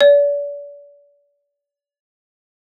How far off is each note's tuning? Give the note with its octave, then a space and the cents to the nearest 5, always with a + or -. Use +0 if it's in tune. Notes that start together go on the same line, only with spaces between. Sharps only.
D5 -40